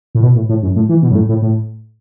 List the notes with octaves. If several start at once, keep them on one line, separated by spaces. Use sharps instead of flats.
A2
B2
A2
A2
F#2
A2
E3
B2
F#2
A2
A2
A2